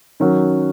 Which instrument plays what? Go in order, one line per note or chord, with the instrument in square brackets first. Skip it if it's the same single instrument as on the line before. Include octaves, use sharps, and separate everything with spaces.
[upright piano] D#3 F#3 C#4 F#4